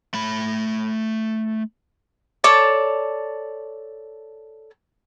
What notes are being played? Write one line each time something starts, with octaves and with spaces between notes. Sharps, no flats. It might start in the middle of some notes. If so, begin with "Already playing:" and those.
A3 B5
A4 C#5 D5 A5